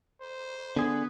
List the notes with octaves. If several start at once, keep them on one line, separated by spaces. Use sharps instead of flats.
C5
D3 B3 G#4